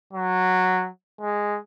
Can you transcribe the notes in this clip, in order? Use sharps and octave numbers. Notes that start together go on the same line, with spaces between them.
F#3
G#3